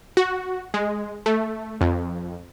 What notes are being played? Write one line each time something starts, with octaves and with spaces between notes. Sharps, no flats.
F#4
G#3
A3
F2